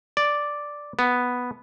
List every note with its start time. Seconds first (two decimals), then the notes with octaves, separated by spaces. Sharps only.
0.17 D5
0.99 B3